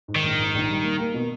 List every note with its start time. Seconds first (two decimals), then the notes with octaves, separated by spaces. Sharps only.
0.08 G#2
0.16 D#3
0.23 A#1
0.38 G#2
0.54 A#1
0.69 G3
0.83 A#3
0.99 A#3
1.14 B2